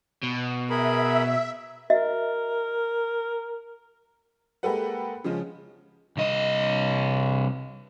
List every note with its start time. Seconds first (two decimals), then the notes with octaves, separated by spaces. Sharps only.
0.23 B2
0.70 G#4 A#4 E5 B5
1.90 F#4 A#4 D#5 E5
4.63 G#3 A#3 G4 A4 B4 F#5
5.24 C#3 F3 G#3 C#4
6.17 C2 D#5